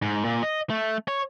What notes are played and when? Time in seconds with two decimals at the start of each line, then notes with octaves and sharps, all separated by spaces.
0.02 G#2
0.24 A#2
0.43 D#5
0.70 A3
1.08 C#5